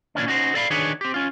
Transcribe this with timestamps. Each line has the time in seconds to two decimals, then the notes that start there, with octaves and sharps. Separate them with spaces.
0.15 A#2 E3 C#4 D4
0.26 C#4 D#4 F#4 C5
0.54 A4 D5 F5 B5
0.70 D#3 D4 G#4 B4 C#5
1.01 C4 G4
1.14 C#4 F4